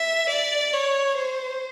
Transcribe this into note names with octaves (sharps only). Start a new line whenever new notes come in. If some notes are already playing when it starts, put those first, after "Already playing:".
Already playing: E5
D5
C#5
C5